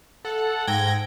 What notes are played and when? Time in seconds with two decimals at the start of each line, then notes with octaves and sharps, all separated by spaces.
0.25 A4 F#5
0.67 G#2 G5 G#6 A#6